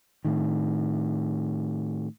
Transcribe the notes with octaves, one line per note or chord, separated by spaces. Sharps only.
A2 D#3